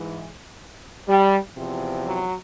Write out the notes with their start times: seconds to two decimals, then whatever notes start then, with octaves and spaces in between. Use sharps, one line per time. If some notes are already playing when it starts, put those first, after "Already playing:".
Already playing: G#2 E3
1.07 G3
1.56 E2 C3 F3
2.04 F#3